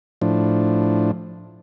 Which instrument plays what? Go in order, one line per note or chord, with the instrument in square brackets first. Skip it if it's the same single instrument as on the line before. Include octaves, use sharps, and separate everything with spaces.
[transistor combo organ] A2 F3 D4